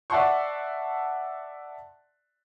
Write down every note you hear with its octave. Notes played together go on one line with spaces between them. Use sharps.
D5 E5 F#5 A5 C6 C#6